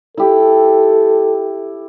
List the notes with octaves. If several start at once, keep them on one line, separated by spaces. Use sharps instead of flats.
E4 G4 A4